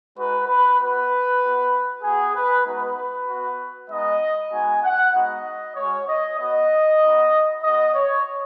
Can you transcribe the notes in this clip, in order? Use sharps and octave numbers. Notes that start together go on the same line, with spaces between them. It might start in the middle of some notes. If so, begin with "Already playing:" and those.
G#3 D#4 F#4 B4
B4
B3 F#4 B4
B3 F#4
B3 F#4 G#4
B4
G#3 B3 D#4 F#4 B4
B3 F#4
G#3 B3 D#4 D#5
G#3 B3 D#4 F#4 G#5
F#5
G#3 B3 D#4 F#4 D#5
G#3 C#4 F#4 C#5
D#5
B3 F#4 D#5
B3 D#4 F#4
B3 F#4 D#5
C#5